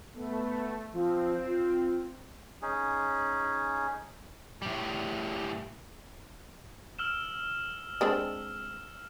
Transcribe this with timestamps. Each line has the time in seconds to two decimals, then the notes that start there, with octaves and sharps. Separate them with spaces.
0.15 A3 B3
0.93 F3 C4
1.46 F4
2.62 C#4 D#4 G#4
4.62 A2 G3
6.99 E6 F6 E7
8.01 G#3 C4 D4